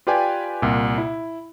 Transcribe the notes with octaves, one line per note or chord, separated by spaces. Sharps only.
F4 G4 B4 D5 G5 G#5
C2 A#2
E4